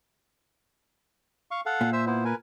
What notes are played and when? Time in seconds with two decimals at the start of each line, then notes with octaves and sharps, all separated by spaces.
1.51 F5 C#6
1.66 A4 F5 F#5
1.81 A#2
1.93 C5 E5 E6
2.06 B3 E4 C5
2.25 A#4 B4 G#5